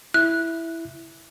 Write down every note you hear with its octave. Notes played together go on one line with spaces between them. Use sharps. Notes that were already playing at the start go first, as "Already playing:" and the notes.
E4 F#6